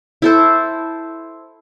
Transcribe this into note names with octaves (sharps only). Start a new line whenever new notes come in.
E4 A4 C5